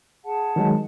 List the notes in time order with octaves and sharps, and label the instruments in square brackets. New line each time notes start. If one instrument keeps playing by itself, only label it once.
[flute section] G#4 F#5 A5
[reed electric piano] D#3 F#3 G#3